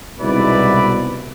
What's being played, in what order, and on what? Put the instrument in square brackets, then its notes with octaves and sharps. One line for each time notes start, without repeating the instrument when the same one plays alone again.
[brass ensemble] C2 G#2 B2 E4 B4 D5